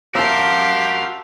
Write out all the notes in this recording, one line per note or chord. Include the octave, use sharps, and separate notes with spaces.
F#4 G4 A#4 E5 F5 A5 C6